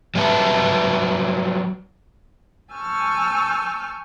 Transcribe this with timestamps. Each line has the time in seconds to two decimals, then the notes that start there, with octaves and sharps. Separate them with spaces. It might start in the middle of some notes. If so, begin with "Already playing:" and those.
0.15 F#3 G3 B4 E5 A5
2.71 G#5 A5 C#6 E6 F6 G6